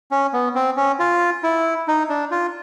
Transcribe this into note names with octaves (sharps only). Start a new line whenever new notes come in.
C#4
B3
C4
C#4
F4
E4
D#4
D4
F4